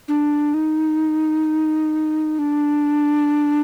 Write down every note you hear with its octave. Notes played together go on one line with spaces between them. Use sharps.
D4
D#4
D4